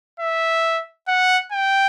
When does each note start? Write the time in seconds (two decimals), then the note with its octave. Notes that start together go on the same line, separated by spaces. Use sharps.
0.20 E5
1.08 F#5
1.52 G5